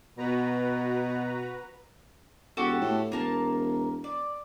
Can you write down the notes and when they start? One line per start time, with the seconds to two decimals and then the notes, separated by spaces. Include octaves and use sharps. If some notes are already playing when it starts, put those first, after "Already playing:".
0.18 B2 F#4 B4 A#5
2.57 E1 F#4 G4 A4
2.81 A2
3.12 E1 A#3 A#4 A5
4.04 D5